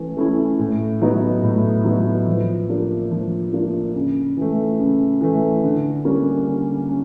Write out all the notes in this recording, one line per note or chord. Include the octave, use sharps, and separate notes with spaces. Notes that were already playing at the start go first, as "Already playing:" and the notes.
Already playing: E3 A3 C#4
A3 C#4 E4
A2
F#3 B3 D#4
A2
F#3 B3 D#4
F3
A#3 D4 F4
F3
A#3 D4 F4
C#3
E3 A3
C#3
E3 A3
D3
G3 A#3 C#4
D3
C#4